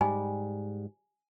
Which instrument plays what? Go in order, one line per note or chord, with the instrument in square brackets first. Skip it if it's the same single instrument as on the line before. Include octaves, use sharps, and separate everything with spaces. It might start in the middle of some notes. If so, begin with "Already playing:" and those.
[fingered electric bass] G#2 [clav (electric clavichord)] G3 [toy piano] G#5